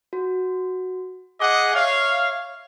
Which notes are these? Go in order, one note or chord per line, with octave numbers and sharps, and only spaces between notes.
F#4
G#4 D#5 F#5 D6
C#5 E5 F5